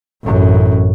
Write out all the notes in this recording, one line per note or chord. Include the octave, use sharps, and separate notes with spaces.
A1 F#2